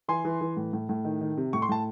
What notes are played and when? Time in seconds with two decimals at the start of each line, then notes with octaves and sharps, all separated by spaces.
0.08 E3 G#5 C6
0.25 E3
0.41 E3
0.57 A2
0.73 A2
0.89 A2
1.05 D#3
1.21 D#3
1.37 C3
1.53 A2 C#6
1.62 C6
1.69 A2 A5